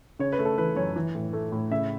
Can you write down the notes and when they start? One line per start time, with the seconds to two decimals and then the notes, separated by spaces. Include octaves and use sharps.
0.19 C#3 C#5
0.33 B4
0.39 A3
0.45 A4
0.58 E3 B4
0.76 F#2 C#5
0.96 E3
1.15 A2
1.33 A3
1.52 A2
1.71 C#3 E5